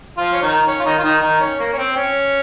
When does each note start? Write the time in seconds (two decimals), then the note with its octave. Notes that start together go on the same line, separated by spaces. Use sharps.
0.17 F3 F4
0.33 C#4
0.42 D#3 D#4
0.67 C#4
0.80 F4
0.85 D#3 D#4
0.98 F4
1.04 D#3 D#4
1.22 D#3 D#4
1.41 C#4
1.59 A#3
1.73 C#4
1.78 C4
1.96 C#4